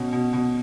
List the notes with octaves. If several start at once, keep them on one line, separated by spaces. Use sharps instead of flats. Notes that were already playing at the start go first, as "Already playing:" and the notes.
Already playing: B2 C#4
B2
B2